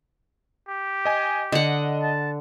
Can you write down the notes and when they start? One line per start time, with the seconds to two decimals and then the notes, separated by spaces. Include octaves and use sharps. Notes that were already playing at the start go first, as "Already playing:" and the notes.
0.68 G4
1.05 D#5 G#5
1.52 D3 D#5 F#5
2.02 A5